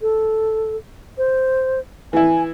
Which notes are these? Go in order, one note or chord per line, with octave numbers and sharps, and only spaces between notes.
A4
C5
E3 E4 G#5